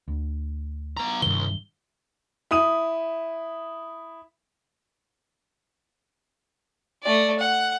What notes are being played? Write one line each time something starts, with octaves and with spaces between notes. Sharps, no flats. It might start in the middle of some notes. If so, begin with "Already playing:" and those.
D2
B3 A#5
C2 G2 D#3 G7
E4 D#6 D#7
A3 D5
F#5